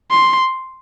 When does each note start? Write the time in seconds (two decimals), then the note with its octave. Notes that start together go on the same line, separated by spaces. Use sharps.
0.11 C6